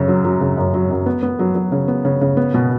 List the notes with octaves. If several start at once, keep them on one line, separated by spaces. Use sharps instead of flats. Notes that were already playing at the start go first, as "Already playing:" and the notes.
Already playing: F#2 C#3
F#3
F#3
C#3
F#2
F#3
F#2
B3
B3
F#3
F#3
C#3
B3
C#3
C#3
B3
B2